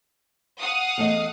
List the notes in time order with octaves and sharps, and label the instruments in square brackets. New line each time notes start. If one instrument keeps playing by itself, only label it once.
[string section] F5 F#5 D#6
[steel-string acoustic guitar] E2 A3 D#5